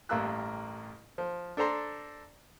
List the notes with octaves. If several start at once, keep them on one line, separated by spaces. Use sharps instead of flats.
A1 G2 A#3 A#4 E6 F#6
F3
D4 A4 C5 A#5 C6